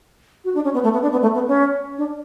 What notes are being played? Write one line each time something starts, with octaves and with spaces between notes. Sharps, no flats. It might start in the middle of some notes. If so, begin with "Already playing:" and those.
F#4
D4
C#4
B3
A3
B3
D4
B3
A3
B3
C#4
D4